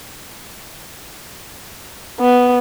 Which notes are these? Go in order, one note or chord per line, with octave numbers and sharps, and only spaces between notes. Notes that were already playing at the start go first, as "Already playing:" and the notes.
B3